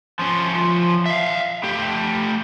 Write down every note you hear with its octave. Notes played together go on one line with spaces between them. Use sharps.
F3 C#4
E5 F5
A3 G4